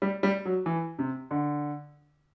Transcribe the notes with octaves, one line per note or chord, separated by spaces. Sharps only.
G3
G3
F#3
E3
C3
D3